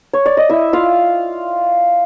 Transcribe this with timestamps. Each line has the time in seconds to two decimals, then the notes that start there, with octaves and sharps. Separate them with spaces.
0.13 C#5
0.26 D5
0.37 D#5
0.49 E4 E5
0.73 F4 F5